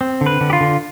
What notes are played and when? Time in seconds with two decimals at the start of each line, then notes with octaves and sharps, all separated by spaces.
0.01 C4
0.21 D3
0.26 B4
0.41 D3
0.50 G4
0.53 F4
0.61 D3